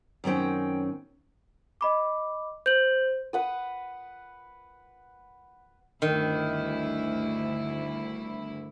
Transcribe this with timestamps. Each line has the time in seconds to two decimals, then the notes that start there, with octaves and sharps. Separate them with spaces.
0.24 F#2 D#3 C4 C#4 G5
1.81 D#5 B5 D6
2.66 C5 G6 F#7
3.33 B4 F#5 D#6
6.02 G1 D2 D#3 E4